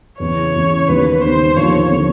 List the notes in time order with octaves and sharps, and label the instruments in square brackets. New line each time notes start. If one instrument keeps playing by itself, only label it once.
[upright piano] E2 C#3 E3 [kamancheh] C#5
[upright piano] E2 C#3 E3
[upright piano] D#2 D#3 G3 B3 [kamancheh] B4
[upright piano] D#2 D#3 G3 B3 [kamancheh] C5
[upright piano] D#2 D3 F3 [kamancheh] C#5
[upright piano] D3 F3